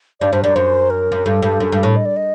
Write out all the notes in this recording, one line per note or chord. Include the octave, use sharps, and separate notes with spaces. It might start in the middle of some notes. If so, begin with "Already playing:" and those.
G2 D5
G2 C5
F#2 D5
F#2 C5
A#4
F#2
G2 A4
G2
F#2
G2
A2
D#5
D5
D#5